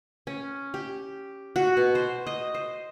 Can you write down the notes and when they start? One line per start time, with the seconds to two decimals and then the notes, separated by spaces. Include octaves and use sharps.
0.27 C#4
0.74 G4
1.56 F#4
1.77 B2
1.95 C5
2.27 D#5
2.54 C5